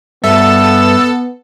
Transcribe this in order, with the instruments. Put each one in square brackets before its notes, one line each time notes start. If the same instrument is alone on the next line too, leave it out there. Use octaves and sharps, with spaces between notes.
[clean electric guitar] G2 E5 [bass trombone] B3 [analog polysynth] A4 [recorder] E6